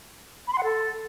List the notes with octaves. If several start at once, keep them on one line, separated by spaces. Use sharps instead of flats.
B5
C6
F#5
A4